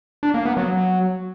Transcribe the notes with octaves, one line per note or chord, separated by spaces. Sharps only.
D4
A#3
B3
F#3